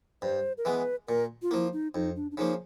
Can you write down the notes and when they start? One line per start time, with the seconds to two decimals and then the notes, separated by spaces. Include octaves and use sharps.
0.22 G2 C5
0.58 A#4
0.65 E3 G#3 B3 B4
1.08 A#2 A#4
1.42 F4
1.51 F3 A#3 E4
1.73 D#4
1.95 F2 D#4
2.16 D4
2.31 D4
2.37 C#3 F3 A#3 D#4